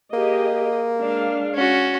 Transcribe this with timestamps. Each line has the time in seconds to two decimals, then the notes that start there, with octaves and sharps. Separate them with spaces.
0.13 A#3 G4 G#4 D#5
1.00 G#3 D4 F5
1.55 C#4 F#4